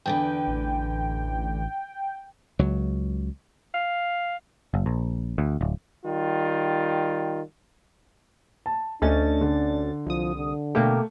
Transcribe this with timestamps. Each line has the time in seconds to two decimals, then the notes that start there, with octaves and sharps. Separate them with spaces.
0.06 E2 D3 B4 G5
0.48 A1
2.59 C#2 F#3
3.74 F5
4.74 F#1
4.86 A#1
5.38 D2
5.61 D1
6.06 D#3 G3 F4
8.66 A5
9.02 D2 A3 C#4 D4 D#5 A6
9.41 D3
10.06 C2 F3 D#6
10.36 D3
10.75 B2 A3 A#3 G4